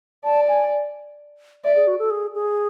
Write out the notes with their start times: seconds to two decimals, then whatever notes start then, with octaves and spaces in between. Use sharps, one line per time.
0.24 D5 A5
0.49 G#5
1.64 D5 E5
1.76 G#4
1.87 F#4
1.99 A4
2.10 G#4
2.34 G#4